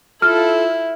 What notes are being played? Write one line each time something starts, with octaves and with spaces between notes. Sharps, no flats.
E4 F4 A4 F6